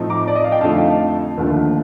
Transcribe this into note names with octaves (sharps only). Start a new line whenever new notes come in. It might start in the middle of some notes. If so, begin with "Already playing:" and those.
Already playing: A2 F3 A3 C4 D#4
A#5 D6
D5
D#5
F5
G5
F2 D3 F3 A3 D#4 F5 A5
D#2 D3 F3 A3